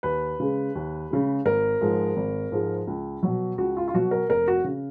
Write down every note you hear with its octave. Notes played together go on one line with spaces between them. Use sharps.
D#2 B4
C#3 G#3
D#2
C#3 G#3
G#1 A#4
G#2 F3 G#3
G#1
G#2 F3 G#3
C#2
B2 F#3
C#2 F#4
F4
F4
B2 F#3 F#4
A#4
F1 A#4
F#4
C#3